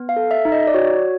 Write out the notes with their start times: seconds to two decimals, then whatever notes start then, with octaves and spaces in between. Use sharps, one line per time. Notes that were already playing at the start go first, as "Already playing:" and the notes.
Already playing: B3
0.09 F5
0.16 A4
0.31 E5
0.45 D#4
0.52 D#5
0.67 D5
0.74 F#4 C#5